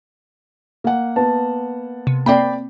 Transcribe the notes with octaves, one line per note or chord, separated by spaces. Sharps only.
A#3 F#5
B3 A5
C3
A#3 C4 D5 G5 B5